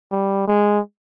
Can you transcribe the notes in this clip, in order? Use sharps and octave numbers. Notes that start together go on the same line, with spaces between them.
G3
G#3